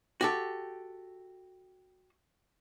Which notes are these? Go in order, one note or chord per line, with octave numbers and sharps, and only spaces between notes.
F#4 G4 A4